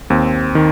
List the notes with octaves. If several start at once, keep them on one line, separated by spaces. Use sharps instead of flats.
D#2 C4
D#3